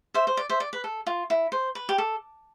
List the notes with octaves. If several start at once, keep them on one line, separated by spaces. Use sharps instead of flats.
C5 E5
C5
D5
C5 E5
D5
B4
A4
F4
E4
C5
B4
G4
A4